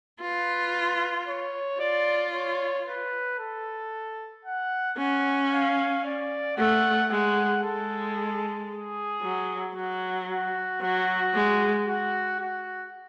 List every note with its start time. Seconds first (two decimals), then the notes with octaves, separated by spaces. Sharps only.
0.21 F4 B4
1.27 C#5
1.80 F4 D5
2.33 C#5
2.87 B4
3.39 A4
4.45 F#5
4.98 C#4 F#5
5.52 F5
6.04 D5
6.57 A3 F#5
7.10 G#3 F#5
7.63 G#3 A4
8.70 G#4
9.22 F#3
9.75 F#3 F#4
10.29 F#4
10.81 F#3 F#4
11.34 G#3
11.87 F#4
12.40 F#4